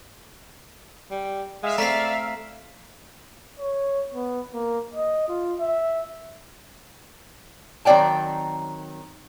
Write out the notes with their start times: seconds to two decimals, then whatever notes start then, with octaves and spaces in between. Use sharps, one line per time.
1.11 G3
1.63 G#3 E5 F5
1.78 A3 C4 D5 A#5 B6 C7
3.60 C#5
4.14 B3
4.54 A#3
4.94 D#5
5.28 F4
5.60 E5
7.85 D#3 F#3 C4 D5 G5 A5